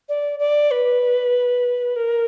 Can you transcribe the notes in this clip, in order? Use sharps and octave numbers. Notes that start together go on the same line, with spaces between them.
D5
D5
B4
A#4